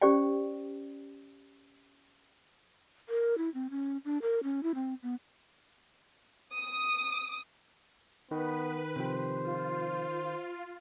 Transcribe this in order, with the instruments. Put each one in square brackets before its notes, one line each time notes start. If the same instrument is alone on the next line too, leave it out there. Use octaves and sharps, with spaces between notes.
[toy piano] C#4 G4 C5 D5 G5
[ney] A#4
E4
C4
C#4
D4
A#4
C#4
E4
C4
B3
[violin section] D#6
[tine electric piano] D#3 [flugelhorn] B3 [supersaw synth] B4
[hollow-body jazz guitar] C3 F3 G4 [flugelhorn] C5
[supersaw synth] F4